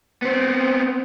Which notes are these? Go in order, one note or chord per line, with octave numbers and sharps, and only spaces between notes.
B3 C4